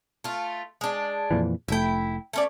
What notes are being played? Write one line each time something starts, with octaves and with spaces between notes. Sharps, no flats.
A3 F4
G#3 D4
F2 A#2 E3
F1 A3 E4 G5
A3 C#4 D5